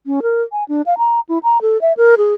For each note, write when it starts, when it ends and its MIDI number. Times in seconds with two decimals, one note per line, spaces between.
0.06 0.20 61
0.22 0.42 70
0.52 0.64 80
0.68 0.82 62
0.86 0.97 77
0.98 1.20 82
1.29 1.38 64
1.43 1.61 82
1.62 1.80 69
1.81 1.93 76
1.97 2.15 70
2.18 2.34 68